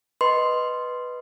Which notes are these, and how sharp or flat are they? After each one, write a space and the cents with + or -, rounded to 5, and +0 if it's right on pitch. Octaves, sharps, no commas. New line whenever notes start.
B4 +0 D#5 +0 C6 +0